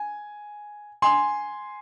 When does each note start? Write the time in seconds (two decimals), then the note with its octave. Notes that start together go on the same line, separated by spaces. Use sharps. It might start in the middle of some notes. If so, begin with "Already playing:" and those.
Already playing: G#5
1.02 G#5 C6